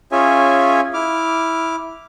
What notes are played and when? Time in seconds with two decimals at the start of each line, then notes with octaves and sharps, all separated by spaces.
0.12 C#4 F4 G#4 C#5 E5 G#5
0.94 E4 D6 F6